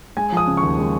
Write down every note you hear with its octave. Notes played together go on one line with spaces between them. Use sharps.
G#3 G#5
F3 D#6
C#3
C#6
D#2
G#3